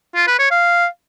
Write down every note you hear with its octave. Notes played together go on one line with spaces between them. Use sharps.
F4
B4
C#5
F5